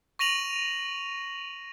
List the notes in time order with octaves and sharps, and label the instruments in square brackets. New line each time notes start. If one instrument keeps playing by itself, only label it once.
[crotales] C#6 A#6 D#7 F7 F#7